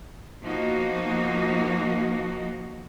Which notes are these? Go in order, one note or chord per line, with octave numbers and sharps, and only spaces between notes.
B2 F3 A#3 D#4 F#4